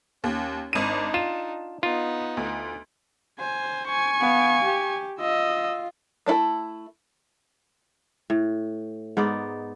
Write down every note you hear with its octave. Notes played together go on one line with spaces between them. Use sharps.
D#2 C#4
G#1 D4 D#4 D#7
F4 E7
B3 D#4 F4
D2
C5 G#5
G#5 C#6
B3 F5
G4
F4 D#5 E6
A3 D4 E4 A4 A5
A2
G#2 B3 D#4 D5